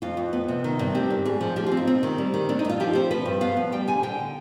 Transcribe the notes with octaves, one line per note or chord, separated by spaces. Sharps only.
F2 F4
F2
B3
C3
D#3
G2
C4 G4
G3
G#2 G#4
F3
F3 G4
F4
C4
D#4
C4
D#3
G3
D#3
C4 D4
D#4
G2 F4
F3 G4
C4 C5
F3 B4
G2
B3 F5
F3
G3 G5
D3 G#5
D3 G5